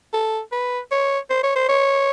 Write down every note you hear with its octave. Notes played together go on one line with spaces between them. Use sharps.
A4
B4
C#5
C5
C#5
C5
C#5